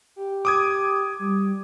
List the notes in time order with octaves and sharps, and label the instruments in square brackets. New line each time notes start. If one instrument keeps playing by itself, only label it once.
[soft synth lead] G4
[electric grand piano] D6 D#6 G#6
[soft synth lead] G3